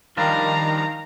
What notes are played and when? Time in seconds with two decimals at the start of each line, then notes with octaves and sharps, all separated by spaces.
0.17 D#3 F3 G3 D4 F5 A#5